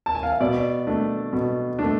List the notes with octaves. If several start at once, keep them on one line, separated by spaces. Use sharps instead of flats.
A5
G#5
F5
E5
B2 D5
A3 D4
B2
A3 D4